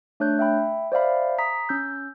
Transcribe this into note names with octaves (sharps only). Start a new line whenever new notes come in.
A3 D4 C#5 F#6 G6
E5 G5 B5
C5 D5 E5 F5 B5
A#5 D#6 B6
C#4 E6 G6